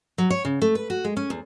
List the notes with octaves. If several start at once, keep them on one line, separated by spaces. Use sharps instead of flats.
F#3
C#5
C#3
A3
B4
F#4
G#3
C#4
E2